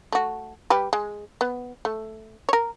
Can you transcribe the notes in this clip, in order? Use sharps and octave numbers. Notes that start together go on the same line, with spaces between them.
A3 F#4
G3 G4 B4
G#3
B3
A3
A#4 C#5